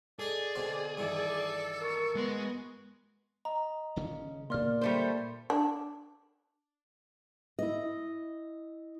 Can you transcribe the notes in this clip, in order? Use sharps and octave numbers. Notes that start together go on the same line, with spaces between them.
G#4 A4 D5 D#5
B2 D3 C4
G2 D#3 E3 A4 D5
A#4 C#6
G#3 B3 F#4 C6
D#5 A#5
D#1 C#3 C#4
G2 A#2 A#3 D5 C6 F6
G3 A3 C5
D4
E4 D#5